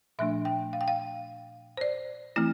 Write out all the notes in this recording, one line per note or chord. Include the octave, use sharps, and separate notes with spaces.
A#2 F3 A3 D4 E5
G5
F5
G5
F5
C5
D5
E3 A3 C4 E4